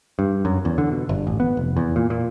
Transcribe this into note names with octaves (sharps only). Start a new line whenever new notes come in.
G2
F#2
E2
D3
B2
G1
A1
B3
F1
E2
A#2
A#2